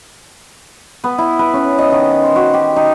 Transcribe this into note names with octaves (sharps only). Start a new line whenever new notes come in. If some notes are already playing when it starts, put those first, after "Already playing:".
B3
E4
B4
C#4
D#5
D#3
C5
F#4
G4
D#4